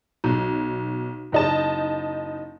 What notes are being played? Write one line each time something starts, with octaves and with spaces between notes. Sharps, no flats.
B1
F#1 D#4 A5